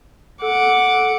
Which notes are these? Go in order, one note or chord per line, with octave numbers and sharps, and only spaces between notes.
A4 F#5 D6